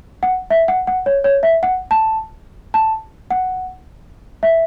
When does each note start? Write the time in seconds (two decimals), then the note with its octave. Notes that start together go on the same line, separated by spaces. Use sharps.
0.23 F#5
0.50 E5
0.68 F#5
0.87 F#5
1.06 C#5
1.24 C#5
1.43 E5
1.63 F#5
1.91 A5
2.74 A5
3.31 F#5
4.43 E5